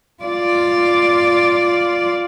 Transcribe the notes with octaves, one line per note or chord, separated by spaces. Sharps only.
F4 D5